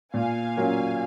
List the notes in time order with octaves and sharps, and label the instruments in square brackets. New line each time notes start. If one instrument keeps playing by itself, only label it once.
[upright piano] A#2 [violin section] F5 G#5
[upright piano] F#3 C#4 F4 A#4